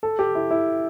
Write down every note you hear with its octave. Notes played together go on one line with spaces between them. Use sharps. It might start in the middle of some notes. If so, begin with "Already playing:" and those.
A4
G4
E4
E4